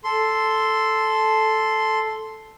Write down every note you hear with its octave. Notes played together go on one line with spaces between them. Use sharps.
A4 C6